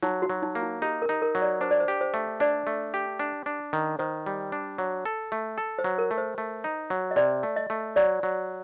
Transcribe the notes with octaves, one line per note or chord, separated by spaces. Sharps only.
F#3 D#4
F#4
F#3
D#4
A#3
D#4
D#4 G4
A#4
D#4
A#4
F#3
D5
D4 C5
D5
C5
G4
C5
A3
D4 D5
A3
G4
D4
D4
D#3
D#3 C5
G3
D4
F#3
A4
A3
A4
C5
F#3
A#4
A3
C5
A3
D#4
F#3
D#5
C3 D5
A3
D#5
A3
F#3 D5
F#3